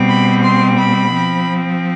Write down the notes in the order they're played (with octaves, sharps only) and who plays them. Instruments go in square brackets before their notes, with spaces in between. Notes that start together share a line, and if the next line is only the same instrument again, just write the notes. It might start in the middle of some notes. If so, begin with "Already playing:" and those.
Already playing: [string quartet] B2 G3 C4
B5
C6
B5
F3 C4